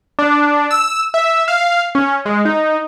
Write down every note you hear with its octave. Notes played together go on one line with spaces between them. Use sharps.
D4
E6
E5
F5
C#4
G#3
D#4